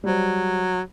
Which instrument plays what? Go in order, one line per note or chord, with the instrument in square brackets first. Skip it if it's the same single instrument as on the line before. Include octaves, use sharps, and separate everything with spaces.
[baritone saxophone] F#3 [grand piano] G3 C5